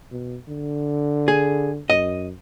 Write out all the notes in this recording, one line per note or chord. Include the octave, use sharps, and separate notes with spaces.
B2
D3
G#4
F#2 D#5